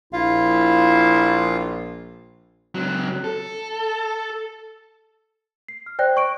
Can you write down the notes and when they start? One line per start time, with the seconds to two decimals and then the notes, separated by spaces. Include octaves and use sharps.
0.13 A#1 E4 F4 F5
2.75 C#2 F#3
3.24 A4
5.68 C7
5.86 F6
5.99 C5 D5 G5 F#6 A#6
6.16 D5 C#6 F#6 D7